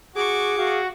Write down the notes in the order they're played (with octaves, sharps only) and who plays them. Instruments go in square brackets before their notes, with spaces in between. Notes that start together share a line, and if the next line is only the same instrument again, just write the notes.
[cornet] F#4 [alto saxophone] G#4 [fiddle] C#6 D6
[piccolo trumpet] F#4 [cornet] F5